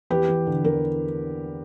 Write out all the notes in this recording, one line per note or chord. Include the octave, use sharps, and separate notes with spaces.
E2 G4 B4
E2
D3
E2 A#4